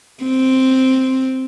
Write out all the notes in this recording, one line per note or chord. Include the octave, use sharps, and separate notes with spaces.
C4